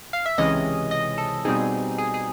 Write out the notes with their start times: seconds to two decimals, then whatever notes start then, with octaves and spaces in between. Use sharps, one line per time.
0.13 F5
0.26 E5
0.38 C#2 C3 E3 G#3 C#4 D#5
0.91 D#5
1.18 A4
1.45 B2 G3 C4 D#4 G#4
1.98 G#4
2.14 G#4